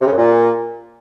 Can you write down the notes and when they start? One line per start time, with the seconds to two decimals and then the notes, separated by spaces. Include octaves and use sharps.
0.01 C3
0.06 C#3
0.12 F#2
0.18 A#2